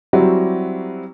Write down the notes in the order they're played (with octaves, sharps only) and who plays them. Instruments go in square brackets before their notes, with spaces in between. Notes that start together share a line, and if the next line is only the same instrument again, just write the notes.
[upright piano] F#3 G3 C4 E4 F#4 G4